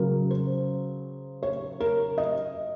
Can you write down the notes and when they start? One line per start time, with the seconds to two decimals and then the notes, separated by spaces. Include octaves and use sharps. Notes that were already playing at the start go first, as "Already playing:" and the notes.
Already playing: C#3 F#3 A#4
0.31 C5
1.43 C#5
1.80 A#4
2.18 D#5